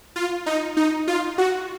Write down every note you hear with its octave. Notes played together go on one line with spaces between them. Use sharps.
F4
D#4
D#4
F4
F#4